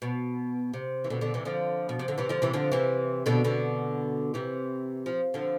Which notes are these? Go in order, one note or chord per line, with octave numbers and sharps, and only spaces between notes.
B2
C3
E3
B2 D3
B2 D3
C3 E3
D3 F3
B2
C3
D3
C3 E3
D3 F3
C3 E3
D3 F3
C3 E3
B2 D3
B2 D3
C3 E3
F3
D3 F3